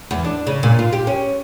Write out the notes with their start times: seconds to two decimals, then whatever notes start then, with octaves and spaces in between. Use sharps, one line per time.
0.11 E2
0.24 D4
0.47 C#3
0.63 A#2
0.79 F4
0.93 G4
1.07 C#4